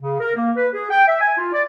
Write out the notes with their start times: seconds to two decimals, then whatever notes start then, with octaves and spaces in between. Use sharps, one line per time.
0.02 C#3
0.20 A#4
0.36 A#3
0.57 B4
0.73 G#4
0.91 G5
1.08 E5
1.21 G#5
1.38 F4
1.53 D5